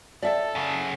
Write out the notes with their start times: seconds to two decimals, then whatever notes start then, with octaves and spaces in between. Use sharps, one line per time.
0.23 A4 D5 E5 G5
0.55 F#2 C#3